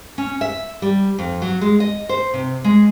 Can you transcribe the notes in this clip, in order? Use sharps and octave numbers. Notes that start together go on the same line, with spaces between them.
C#4
E5
G3
F2
F#3
G#3
D#5
C5
C3
G#3